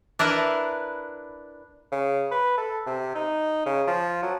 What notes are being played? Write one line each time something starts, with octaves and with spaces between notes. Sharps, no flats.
D4 E4 A#4 B4
C#3
B4
A4
C3
D#4
C#3
F3
F#3